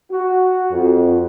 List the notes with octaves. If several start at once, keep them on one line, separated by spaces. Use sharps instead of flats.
F#4
F2